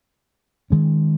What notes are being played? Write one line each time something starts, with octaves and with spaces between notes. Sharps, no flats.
D#3 G#3 C#4